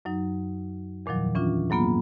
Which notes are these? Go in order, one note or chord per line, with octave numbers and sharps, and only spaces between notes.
F#2 F#3 D#4
E2 A#2 D#3 F3 F#3
E3 C#4 D4 F4
G#2 F#3 A#3 B3 F4